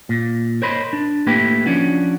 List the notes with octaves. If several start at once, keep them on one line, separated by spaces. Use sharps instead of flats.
A#2
A#4 C5 C#5 D#5 B5 C6
D4
A2 A#3 E4 G4 B4 G5
F3 C#4 D4 F#4